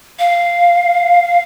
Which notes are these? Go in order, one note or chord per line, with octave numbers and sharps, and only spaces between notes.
F5